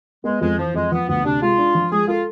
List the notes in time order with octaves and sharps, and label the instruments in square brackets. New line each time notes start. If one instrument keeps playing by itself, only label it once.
[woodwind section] G#3 [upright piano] B3
[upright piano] F2 [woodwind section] G#3
[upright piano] E3 [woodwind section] F3
[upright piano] F2 [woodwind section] G#3
[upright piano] F3 [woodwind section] B3
[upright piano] D2 [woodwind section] B3
[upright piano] C3 [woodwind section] D4
[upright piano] G#3 [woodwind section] F4
[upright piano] D4
F3
[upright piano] G#3 [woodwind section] G#4
[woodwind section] F4 [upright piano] A4